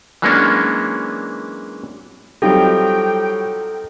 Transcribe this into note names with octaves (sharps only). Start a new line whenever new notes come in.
E3 F#3 G#3 A#3 C#4 D4
F#3 G3 C4 D#4 F4 G4 A4 G5